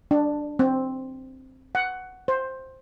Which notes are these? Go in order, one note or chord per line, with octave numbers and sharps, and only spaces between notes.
D4
C4
F#5
C5